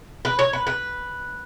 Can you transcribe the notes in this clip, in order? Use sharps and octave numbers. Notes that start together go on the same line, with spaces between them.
B4
C#5
B4
B4